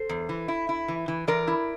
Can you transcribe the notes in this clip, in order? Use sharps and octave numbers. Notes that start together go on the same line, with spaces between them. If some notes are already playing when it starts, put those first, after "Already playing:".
Already playing: A4 C5
E2
E3
E4
E4
E3
E3
E3 A#4 D5
E4